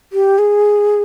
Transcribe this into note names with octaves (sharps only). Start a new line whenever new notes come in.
G4
G#4